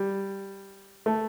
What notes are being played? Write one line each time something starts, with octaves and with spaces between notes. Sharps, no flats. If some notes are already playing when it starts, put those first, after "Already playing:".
Already playing: G3
A3